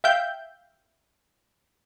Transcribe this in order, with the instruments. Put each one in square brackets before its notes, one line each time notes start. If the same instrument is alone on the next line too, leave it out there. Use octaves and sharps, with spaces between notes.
[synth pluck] E5 F5 G5 G6